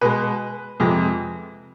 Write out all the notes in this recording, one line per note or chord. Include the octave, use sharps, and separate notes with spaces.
B2 G#3 B4
F2 C3 F3 G#3